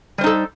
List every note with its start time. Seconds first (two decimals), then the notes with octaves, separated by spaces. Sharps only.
0.18 G3
0.21 C5
0.24 D#4
0.26 A4